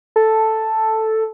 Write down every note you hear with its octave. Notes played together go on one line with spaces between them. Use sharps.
A4